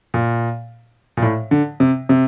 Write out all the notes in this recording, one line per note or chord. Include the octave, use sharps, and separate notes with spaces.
A#2
A#2
A2
D3
C3
C3